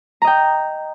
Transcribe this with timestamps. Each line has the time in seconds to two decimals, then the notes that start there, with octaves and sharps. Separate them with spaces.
0.22 A#5
0.24 D#5
0.27 G5